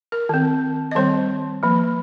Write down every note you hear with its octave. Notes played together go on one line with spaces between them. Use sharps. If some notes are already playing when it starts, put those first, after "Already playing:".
A#4
D#3 C4
D#5
D#3 G3 C4 C5
F3 A#3